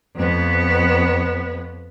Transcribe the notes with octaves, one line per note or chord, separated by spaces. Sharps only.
F2 B3